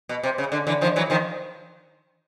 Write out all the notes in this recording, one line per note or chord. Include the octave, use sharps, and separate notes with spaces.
B2
C3
C#3
D3
D3 E3
D#3 F3
E3 F#3
D#3 F3